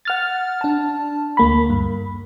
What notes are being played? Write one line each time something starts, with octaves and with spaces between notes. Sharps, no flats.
F#5 F6 A6
D4 A5
D2 A#3 B5
G2